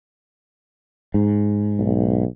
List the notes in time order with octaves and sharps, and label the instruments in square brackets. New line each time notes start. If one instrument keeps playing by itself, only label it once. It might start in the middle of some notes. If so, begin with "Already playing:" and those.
[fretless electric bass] G#2
[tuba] B1